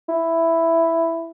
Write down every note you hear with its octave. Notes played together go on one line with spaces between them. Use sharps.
E4